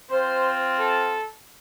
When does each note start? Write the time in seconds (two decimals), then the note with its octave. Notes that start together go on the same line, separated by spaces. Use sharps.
0.11 C4 F4 C5
0.79 A4